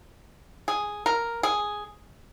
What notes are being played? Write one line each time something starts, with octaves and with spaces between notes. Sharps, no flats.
G#4
A#4
G#4